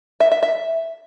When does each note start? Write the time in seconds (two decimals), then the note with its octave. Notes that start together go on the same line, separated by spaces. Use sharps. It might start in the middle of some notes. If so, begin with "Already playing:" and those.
0.20 E5
0.31 E5
0.43 E5